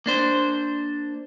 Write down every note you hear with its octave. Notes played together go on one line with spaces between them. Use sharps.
A#3 D4 C5